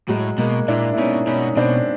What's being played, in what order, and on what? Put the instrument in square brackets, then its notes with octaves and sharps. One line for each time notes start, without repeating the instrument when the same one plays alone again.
[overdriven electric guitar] A2 [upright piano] F#3 G#3
[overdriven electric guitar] B2 [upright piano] G#3 A#3
[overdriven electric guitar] A#2 [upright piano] D4 E4
[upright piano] E4
[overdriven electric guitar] B2 [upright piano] C#4 D#4
[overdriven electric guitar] B2 [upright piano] C#4 D#4
[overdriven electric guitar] B2 [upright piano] C4 D4